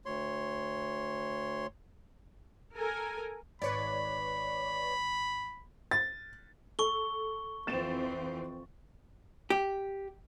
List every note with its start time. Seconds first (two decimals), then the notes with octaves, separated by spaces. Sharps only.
0.06 D2 C#5 C6
2.76 A4 A#4 G#5
3.62 G#1 B4 C#5 D5 B5
5.91 A6
6.79 A4 C#6 G7
7.67 F2 E3 C4 A6 E7
9.50 G4